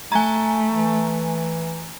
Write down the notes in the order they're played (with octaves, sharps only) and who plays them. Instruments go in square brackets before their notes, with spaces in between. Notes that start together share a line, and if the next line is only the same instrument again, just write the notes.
[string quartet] A3 [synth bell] G#5 A#5
[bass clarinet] E3